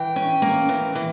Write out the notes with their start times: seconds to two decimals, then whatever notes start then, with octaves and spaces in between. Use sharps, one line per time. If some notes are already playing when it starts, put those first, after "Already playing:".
Already playing: E3 G5
0.16 C#4
0.42 A#3
0.69 E3
0.95 E3